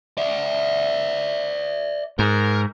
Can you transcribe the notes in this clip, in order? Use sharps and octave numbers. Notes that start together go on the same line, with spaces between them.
D5 E5
G#2 A#4